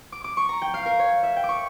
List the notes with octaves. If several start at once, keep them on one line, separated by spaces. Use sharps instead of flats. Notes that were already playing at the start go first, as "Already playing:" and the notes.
D6
D6
C#6
A#5
G5
F5
A#4
C#5
E5
G5
D6
C#6